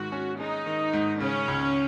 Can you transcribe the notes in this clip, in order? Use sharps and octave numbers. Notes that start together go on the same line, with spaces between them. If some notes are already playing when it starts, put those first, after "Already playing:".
Already playing: G#2 D#3 F#4
C#4
G#3 D#4
D#3
G#2
C#3 C#4
C#2